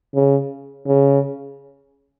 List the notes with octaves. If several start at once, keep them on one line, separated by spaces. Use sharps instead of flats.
C#3
C#3